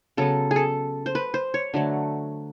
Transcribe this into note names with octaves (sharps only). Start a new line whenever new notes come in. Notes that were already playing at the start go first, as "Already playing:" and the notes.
C#3 F#3 B3 A4
G#4
A4
C5
B4
C5
C#5
D3 F#3 A3